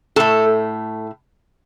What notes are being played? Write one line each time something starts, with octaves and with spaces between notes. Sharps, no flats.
A2 A3 A4